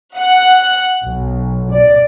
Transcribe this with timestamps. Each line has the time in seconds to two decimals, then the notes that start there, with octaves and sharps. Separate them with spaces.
0.17 F#5
1.05 B1
1.72 D5